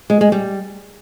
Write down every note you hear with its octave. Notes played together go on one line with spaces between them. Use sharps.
G#3
G#3
G3